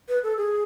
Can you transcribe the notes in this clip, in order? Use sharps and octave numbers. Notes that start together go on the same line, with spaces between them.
B4
A4
G#4